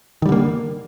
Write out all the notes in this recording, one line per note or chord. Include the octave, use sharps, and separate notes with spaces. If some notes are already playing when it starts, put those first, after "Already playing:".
D3 D#3 G3 A#3